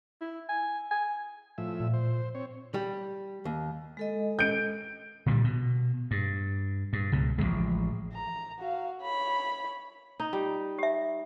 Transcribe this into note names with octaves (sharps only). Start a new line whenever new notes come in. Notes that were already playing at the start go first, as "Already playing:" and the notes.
E4
G#5
G#5
A2 F3 E5
A#2
C5
C4 C#5
G3
D#2
G#3 A4 D#5
G6 D7
A#2 D3 D#3 G3
B2
G2
G2
C#2 B2
A1 C#3 F3 G#3
A#5
F#4 F5
C#5 B5
D#4
G3
G4 E5